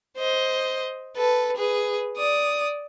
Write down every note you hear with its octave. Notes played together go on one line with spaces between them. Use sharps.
C5 D#5
A4 B4
G#4 B4
D5 D#6